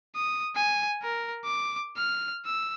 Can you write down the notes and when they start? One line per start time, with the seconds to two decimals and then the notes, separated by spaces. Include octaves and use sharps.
0.16 D#6
0.55 G#5
1.03 A#4
1.45 D6
1.97 F6
2.46 E6